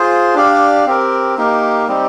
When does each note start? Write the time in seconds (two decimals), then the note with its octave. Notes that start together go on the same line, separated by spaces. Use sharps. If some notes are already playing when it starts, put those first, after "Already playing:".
Already playing: F4 G#4 C5
0.34 D4 G4 D5 F5
0.86 C4 G4 A#4
1.37 A#3 D#4 G4 A#4
1.87 G3 C4 D#4 G4